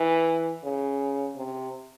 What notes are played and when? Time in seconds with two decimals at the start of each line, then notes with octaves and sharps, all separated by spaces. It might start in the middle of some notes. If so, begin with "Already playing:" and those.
Already playing: E3
0.64 C#3
1.36 C3